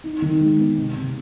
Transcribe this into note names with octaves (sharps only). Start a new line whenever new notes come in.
D#4
D#3
G#3
B3
C3
C3